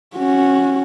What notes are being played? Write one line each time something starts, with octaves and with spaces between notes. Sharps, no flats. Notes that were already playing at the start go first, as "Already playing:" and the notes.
C#4 F#4